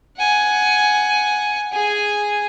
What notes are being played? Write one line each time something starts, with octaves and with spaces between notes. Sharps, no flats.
F#5 G#5
G#4 G#5